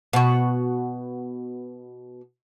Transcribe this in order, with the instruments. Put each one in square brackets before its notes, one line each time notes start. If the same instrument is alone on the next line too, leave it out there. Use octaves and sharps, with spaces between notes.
[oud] B2 F#4